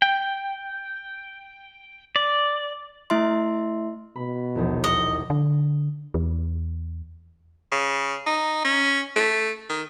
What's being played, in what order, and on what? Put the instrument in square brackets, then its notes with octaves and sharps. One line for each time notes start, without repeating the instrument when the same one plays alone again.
[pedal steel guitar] G5
D5
[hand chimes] A3 E4 E5 C6
[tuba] B2 [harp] B5
[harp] E1 A#1 D#2
[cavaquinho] D#5 [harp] C#7
[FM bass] D3
E2
[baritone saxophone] C#3
D#4
C#4
A3
D#3